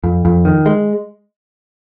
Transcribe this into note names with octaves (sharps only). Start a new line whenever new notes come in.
F2
F2
D#3
G#3